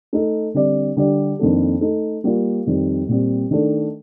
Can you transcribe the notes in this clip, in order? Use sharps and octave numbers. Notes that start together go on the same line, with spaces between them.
A3 D#4 A4
D3 G3 C4 G4 D5
D3 G3 D4 G4 D5
F2 D#3 A#3 D4 A4
A3 D#4 A4
G3 A#3 F4
F2 D#3 G3
A#2 G3 C4
D#3 A3 D4 A4